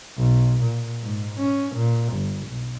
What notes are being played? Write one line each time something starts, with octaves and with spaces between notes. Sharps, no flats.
B1
A#2
G#2
C#4
A#2
G1
B1